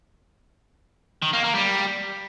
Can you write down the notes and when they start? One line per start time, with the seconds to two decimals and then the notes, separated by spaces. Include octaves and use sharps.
1.22 D#3
1.33 A#3
1.44 A#3
1.55 G3